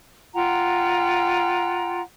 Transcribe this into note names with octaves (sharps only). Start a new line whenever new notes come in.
F4 F#5 G5 A#5